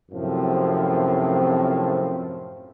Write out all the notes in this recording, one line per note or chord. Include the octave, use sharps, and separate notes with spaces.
F#2 A2 C3 F3 C4